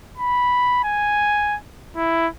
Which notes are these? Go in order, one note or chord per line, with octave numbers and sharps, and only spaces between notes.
B5
G#5
E4